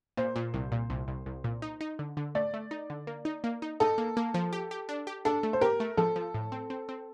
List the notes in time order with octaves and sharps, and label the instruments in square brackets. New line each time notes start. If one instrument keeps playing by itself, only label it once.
[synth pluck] A#2 [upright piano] C5
[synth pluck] A#2
C2
A#2
C2
C2
C2
A#2
D#4
D#4
D3
D3
[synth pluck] A3 [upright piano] D5
[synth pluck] A3
D#4
D3
A#3
D#4
A#3
D#4
[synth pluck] D#4 [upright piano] A4
[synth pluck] A#3
A#3
F3
G4
G4
D4
G4
[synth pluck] D4 [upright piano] A4
[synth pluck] A3
[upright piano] C5
[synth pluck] G4 [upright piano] A#4
[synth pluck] A3
[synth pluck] F3 [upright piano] A4
[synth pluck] F3
A2
C4
C4
C4